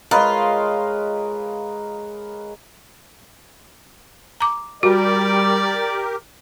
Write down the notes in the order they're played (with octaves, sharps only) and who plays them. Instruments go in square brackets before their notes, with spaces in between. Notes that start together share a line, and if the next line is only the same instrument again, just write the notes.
[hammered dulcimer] G#3 C#5 D#5 [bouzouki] F4 [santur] A#4 B4 F5
[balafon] A#5 D6
[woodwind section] G3 [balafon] F#4 [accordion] G4 A#4 [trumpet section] D5